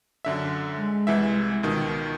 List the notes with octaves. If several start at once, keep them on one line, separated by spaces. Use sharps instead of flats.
F#2 D3 E5
G#3
C2 E3 E5
C#2 B2 D#3